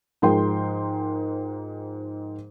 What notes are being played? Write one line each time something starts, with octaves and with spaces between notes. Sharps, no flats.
G#2 F3 G#3 A#4 G5 C6